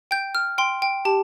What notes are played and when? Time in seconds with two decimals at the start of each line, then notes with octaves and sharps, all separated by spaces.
0.11 G5 G6
0.35 F6
0.58 G5 C6
0.82 G5
1.05 G4 A5